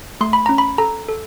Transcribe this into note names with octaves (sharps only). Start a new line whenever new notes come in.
A3 C6
B5
C#4 A#5
B5
A4 A#5
A4